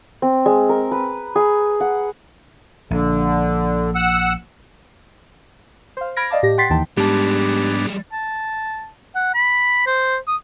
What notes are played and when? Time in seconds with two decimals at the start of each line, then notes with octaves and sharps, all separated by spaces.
0.22 C4
0.46 G#3
0.69 A#4
0.91 B4
1.36 G#4
1.80 F#5
2.91 A#1 D3
3.95 F#5 E6
5.97 C5 F5
6.16 B5 F6 G#6 A#6 D7
6.30 D5 D#5 F5 A5 D6
6.43 A2 G4 A#6
6.58 F#5 G5 C6 A6 B6 C7
6.70 D#2 E3 D#4 G5 A5 C6
6.97 G#2 G3 G#3 B3 D4 G4 A5
8.13 A5
9.15 F#5
9.34 B5
9.87 C5
10.28 D#6